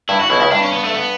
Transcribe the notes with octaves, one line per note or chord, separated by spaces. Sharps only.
G2 E4
F#4
B1 B2 E4
C#2 C#3 E4
G2 D4
C#4
B3
A3
B3